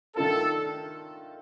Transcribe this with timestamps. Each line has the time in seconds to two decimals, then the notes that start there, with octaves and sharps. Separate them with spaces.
0.16 D#3 A3 D4 F4 A4 A#4